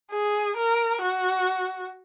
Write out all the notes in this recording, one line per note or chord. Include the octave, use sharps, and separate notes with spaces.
G#4
A#4
F#4